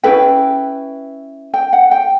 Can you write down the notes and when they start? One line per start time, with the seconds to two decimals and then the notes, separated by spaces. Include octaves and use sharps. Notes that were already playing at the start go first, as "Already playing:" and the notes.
0.04 C#4 E4 G#4 B4 G5
1.54 G5
1.73 F#5
1.91 G5